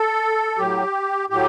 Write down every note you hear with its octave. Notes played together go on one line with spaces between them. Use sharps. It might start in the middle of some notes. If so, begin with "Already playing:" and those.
Already playing: A4
A2 F#3 G4
A2 F#3 G4